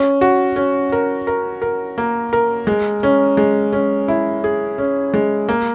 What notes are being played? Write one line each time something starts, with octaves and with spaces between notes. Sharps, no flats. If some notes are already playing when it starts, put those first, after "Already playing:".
Already playing: C#4
F#4
C#4
A#4
A#4
A#4
A#3
A#4
G#3
C#4
G#3
C#4
E4
G#4
C#4
G#3
A#3